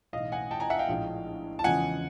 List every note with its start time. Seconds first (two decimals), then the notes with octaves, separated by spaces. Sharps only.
0.13 B1 A2 E3 D#5 F5
0.32 F#5 G#5
0.51 G5 A5
0.60 G#5 A#5
0.70 E5 F#5
0.79 F5 G5
0.89 A#1 A2 F3 G#3
1.59 A5
1.64 E2 C#3 F3 G#3 F#5 G#5